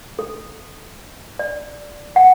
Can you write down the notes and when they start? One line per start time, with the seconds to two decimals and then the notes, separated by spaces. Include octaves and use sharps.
0.19 A4
1.39 D5
2.16 F#5